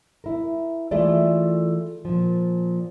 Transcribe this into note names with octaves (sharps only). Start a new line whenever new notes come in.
E4 A#4
E3 A3 F4 G#4 A4 D5
A#2 F3